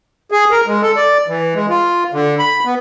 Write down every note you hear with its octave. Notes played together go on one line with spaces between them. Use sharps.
G#4
A#4
G#3
A4
D5
E3
G#3
F4
D3
B5
B3